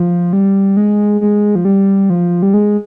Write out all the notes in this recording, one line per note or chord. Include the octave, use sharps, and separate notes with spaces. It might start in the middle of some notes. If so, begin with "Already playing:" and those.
Already playing: F3
G3
G#3
G#3
F3
G3
F3
G3
G#3